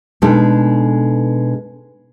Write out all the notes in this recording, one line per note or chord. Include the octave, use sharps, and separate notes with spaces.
B2 G#3 D4 D#4 A4